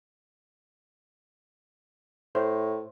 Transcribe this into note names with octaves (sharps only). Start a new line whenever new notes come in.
A2 C5